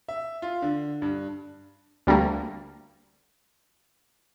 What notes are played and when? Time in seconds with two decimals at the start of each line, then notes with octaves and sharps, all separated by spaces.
0.09 E5
0.42 F4
0.62 D3
1.02 G2
2.07 D2 G3 A3 A#3